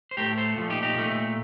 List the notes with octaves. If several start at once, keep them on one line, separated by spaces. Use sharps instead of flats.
C5
A2 A3 G4 A#4
A4 C5
A#2 F3 A3
D#4 G4
D#4 G4
A#2 A3